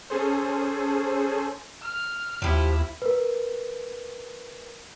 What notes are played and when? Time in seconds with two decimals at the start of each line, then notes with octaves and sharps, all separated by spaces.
0.10 C#4 G#4 A4 C5
1.81 F6
2.42 D#2 F3 E4 G4 E5
3.02 A#4 B4